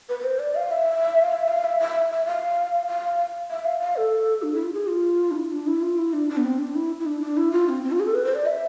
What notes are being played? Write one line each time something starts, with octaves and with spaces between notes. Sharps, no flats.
B4
B4
C5
D5
F5
E5
F5
E5
F5
E5
E5
E5
F5
F5
E5
F5
F5
A4
D4
E4
F4
G#4
F4
D4
E4
D4
E4
F4
E4
D4
D4
B3
C4
D4
E4
E4
D4
D4
E4
F4
C4
C4
F4
G#4
A4
B4
C5
D5
E5